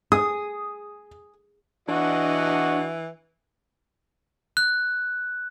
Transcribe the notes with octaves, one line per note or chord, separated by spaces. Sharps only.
G#4 D#6
E3 D4 F#4 D#5 F#5
F#6